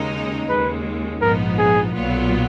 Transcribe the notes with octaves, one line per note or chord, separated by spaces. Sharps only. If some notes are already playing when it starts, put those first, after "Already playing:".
Already playing: D#2 C#3 G#3 D#4
D#2 C#3 G#3 B4
A#1 G#2 F3 B3 D#4 A#4
G#4
B1 A#2 F#3 B3 F4